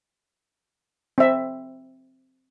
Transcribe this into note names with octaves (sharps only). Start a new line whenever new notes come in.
C4 E5